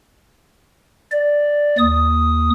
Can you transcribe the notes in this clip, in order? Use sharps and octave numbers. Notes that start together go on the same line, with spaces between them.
D5
D#2 D#6